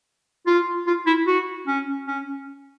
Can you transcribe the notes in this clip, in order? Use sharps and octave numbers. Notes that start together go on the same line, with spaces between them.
F4
F4
E4
F#4
C#4
C#4